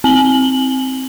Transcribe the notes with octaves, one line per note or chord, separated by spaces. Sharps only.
C4 F#7 G7